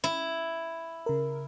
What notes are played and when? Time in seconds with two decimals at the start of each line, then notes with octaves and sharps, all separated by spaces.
0.04 E4
1.06 C#3 A#4